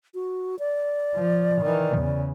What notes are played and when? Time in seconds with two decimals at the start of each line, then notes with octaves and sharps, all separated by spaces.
0.14 F#4
0.59 D5
1.15 F3
1.62 D#3 E3
1.98 E2 C#3